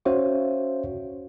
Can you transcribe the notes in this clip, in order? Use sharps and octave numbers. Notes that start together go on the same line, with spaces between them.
C#4 F#4 C5 C#5 E5 F5